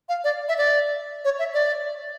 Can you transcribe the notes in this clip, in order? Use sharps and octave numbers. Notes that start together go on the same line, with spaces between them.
F5
D5
E5
D5
C#5
E5
D5